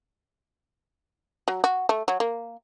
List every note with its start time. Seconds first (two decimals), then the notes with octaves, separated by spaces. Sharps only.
1.48 F#3
1.64 F#4
1.89 A3
2.08 F#3
2.20 A#3